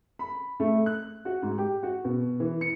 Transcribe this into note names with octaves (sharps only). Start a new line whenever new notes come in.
B5
A3
F#6
F#4
G#2
G4
F#4
B2
E3
C#7